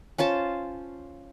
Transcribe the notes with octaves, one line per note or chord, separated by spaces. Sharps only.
C#4 F4 C5 A5